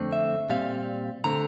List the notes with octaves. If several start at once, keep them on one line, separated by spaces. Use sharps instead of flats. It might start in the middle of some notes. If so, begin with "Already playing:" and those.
Already playing: F2 D3 A3 C4
E5
A#2 G3 C4 F5
D3 A3 C4 A#5